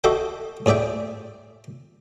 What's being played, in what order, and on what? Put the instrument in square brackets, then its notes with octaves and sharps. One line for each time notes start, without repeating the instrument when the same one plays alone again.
[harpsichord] F#4 A4 D#5 E5 G5 D6
A2 G#4 D5 E5 G5